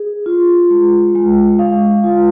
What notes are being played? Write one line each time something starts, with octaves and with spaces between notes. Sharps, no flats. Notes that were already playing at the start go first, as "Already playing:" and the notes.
Already playing: G#4
F4
G#3
G#3
F5
F4